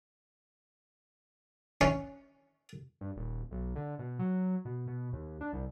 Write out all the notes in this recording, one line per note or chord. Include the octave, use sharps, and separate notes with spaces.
C#4
G2
D#1
B1
D3
B2
F#3
B2
B2
D#2
D4
C2